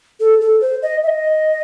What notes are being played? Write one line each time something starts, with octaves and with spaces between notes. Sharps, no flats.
A4
A4
C5
D#5
E5
D#5